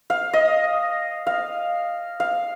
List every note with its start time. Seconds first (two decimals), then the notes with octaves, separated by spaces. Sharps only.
0.10 F5
0.33 D#5
1.27 F5
2.20 F5